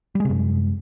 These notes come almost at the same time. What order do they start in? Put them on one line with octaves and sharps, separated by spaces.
G3 G#3 C3 F#2